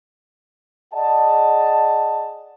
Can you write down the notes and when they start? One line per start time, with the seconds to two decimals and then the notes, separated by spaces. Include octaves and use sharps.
0.94 G#4 D5 D#5 F#5 A5